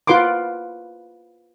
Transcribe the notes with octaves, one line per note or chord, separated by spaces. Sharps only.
F4 B4 F#5 C6 D6